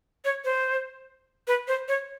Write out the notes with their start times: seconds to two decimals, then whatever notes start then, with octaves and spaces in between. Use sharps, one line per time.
0.25 C#5
0.45 C5
1.48 B4
1.68 C5
1.88 C#5